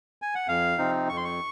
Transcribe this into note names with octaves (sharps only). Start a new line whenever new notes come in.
G#5
F#5
F2 F5
C3 F3 C4 D#4
F2 C#6
C6
C#6